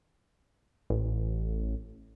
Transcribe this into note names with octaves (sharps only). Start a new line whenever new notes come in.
A1